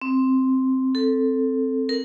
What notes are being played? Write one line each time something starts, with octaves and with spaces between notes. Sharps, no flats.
C4
A4
A#4